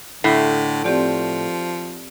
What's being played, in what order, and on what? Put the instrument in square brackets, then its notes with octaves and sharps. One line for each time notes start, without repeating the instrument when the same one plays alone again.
[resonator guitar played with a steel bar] A2 [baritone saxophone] D3
[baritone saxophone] F3 [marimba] C4 G4 D5